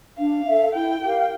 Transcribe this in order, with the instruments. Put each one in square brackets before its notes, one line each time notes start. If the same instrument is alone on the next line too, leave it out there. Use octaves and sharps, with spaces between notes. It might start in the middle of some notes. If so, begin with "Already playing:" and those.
[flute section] D4 [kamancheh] F5
[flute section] A4 E5
[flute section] E4 [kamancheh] G5
[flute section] G4 A#4 F5